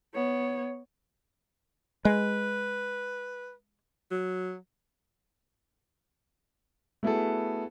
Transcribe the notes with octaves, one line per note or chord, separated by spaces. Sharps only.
B3 C#5
G#3 B4
F#3
A3 B3 E4 F#4 G#4 A4